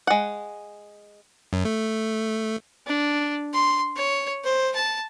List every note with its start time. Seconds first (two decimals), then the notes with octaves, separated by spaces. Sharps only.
0.07 G#3 F#5
1.53 F#2
1.65 A3
2.87 D4
3.53 C6
3.96 C#5
4.44 C5
4.75 A5